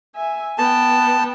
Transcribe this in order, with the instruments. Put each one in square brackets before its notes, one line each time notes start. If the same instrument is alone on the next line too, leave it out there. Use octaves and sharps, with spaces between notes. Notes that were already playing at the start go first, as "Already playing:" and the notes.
[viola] E5 G#5
[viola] B3 G5 [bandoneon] A5